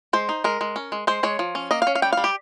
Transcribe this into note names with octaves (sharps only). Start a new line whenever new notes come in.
G#3 C5
D#4
G#3 A#4
G#3
C#4
G#3
G#3 C5
G#3 C#5
F3
C#4
A#3 D#5
F5
C#4
F5
G3 G5
G3 F5
G4